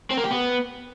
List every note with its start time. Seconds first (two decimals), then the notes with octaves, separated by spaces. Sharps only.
0.11 C4
0.17 A#3
0.24 G4
0.31 B3